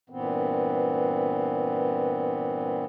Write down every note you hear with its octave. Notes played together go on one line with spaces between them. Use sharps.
G2 A#2 E3 B3 C4